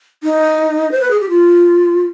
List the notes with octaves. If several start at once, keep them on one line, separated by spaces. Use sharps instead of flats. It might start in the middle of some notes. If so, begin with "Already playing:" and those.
D#4
C5
B4
G#4
G4
F4